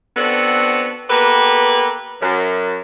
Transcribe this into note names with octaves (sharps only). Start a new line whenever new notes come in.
B3 C4 D4 F#4 A4
A#3 B3 G4 A4 B4
F#2